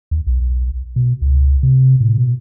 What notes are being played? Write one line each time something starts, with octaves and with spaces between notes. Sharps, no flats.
D#2
B1
B2
C#2
C3
A2
B2